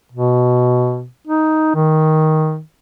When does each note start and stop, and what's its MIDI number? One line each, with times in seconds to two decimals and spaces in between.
0.12 1.06 47
1.27 1.74 63
1.75 2.60 51